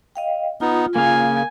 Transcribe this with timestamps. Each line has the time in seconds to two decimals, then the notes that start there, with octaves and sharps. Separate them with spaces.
0.16 D#5 F5 G5
0.61 B3 D#4 F4
0.96 C#3 A#3 F5 G#5